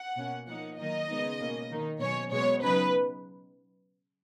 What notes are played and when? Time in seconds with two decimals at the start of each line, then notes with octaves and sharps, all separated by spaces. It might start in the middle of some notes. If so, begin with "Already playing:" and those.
Already playing: F#5
0.17 B2 A#3 C#4
0.47 F3 A#3 D#4 F#5
0.78 D#3 F#3 A#3 D#4 D#5
1.09 C#3 G#3 B3 D#4
1.40 B2 A#3 C#4
1.71 D#3 A#3 D#4
2.01 B2 F#3 C#4 C#5
2.32 B2 G#3 B3 C#5
2.62 C#3 F#3 B3 D#4 B4